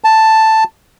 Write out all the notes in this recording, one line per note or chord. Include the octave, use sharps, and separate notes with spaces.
A5